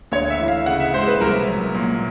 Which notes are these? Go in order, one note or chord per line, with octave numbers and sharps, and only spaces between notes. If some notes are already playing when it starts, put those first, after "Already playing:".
D2 C#5
E5
E3
F5
C#3 F#5
E5
G#3 C5
B4
C2 A#4
F#3
A#2